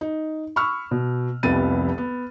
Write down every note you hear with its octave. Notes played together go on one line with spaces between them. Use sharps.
D#4
B5 C#6 E6 F6
B2
F1 C2 F2 B3 A6 D#7
B3